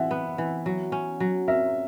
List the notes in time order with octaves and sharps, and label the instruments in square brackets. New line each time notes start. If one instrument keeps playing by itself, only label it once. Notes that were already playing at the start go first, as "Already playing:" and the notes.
Already playing: [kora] E3 [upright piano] E5 F#5
[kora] B3
E3
F#3
C#4
F#3
[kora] A#4 [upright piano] E5